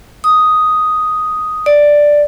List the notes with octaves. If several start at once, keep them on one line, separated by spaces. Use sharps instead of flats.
D#6
D5